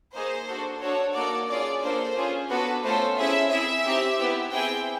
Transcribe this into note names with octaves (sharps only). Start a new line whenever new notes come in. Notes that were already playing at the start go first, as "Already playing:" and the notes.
A#3 D#4 G#4 C5
D4 F#4 A4
D4 F#4 A4 C#5
A#3 D#4 F#4 A4 D5
C#4 F4 G#4 D5
A#3 D4 F4 A4 C5
C#4 F4 G#4
B3 D4 F#4 A4 B4
A3 C#4 F4 A4 C5
C#4 E4 G#4 E5
C4 E4 G#4 E5
C4 D#4 G4
B3 E4 G4
C4 E4 G#4 G5